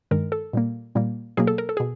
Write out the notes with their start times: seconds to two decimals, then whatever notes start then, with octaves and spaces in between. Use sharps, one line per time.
0.11 G2 D#3 G#3 A#4
0.32 A4
0.53 A#2 G3 A#3
0.95 A#2 G3 A#3
1.37 B2 F#3 A#3 G#4
1.47 A4
1.58 A#4
1.69 A4
1.77 G#4
1.80 B2